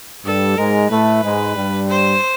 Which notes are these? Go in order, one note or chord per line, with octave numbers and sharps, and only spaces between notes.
G2 G3 A4
G#2 G#3 A#4
A2 A3 B4
G#2 G#3
G2 G3
C5